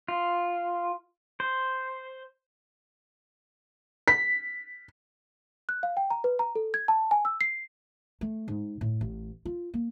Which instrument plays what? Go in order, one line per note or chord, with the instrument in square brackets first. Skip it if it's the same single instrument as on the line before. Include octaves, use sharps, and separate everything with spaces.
[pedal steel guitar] F4
C5
[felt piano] B6
[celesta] F#6
F5
G5
A#5
B4
A#5
A4
G#6
A5
G#5
E6
C7
[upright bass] A3
G#2
A2
A1
F4
A#3